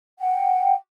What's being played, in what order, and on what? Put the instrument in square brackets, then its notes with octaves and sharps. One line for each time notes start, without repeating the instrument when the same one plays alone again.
[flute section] F#5 G5